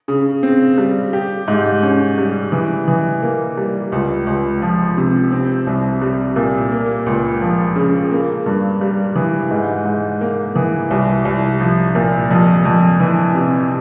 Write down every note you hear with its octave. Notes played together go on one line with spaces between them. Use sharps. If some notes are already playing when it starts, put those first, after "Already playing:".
C#3
C4
G3
G4
G#2
C#4
G3
E3
E3
A#3
G3
C#2
C#2
F3
C3
C4
C2
G3
A#2
A#3
C#2
F3
C#3
A#3
G2
G3
E3
G#2
G#2
A#3
E3
C2
C2
F3
A#2
F2
F2
E3
C3